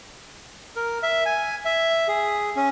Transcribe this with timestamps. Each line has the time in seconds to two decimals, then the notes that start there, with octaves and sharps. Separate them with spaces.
0.76 A#4
1.03 E5
1.26 G#5
1.65 E5
2.08 G#4
2.56 C#4